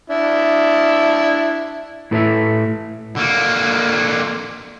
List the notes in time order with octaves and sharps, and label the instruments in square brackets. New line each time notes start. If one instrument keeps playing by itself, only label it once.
[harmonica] D4 E4
[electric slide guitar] A2 E4 A4 B4 D#5 E5
[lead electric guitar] D3 A#3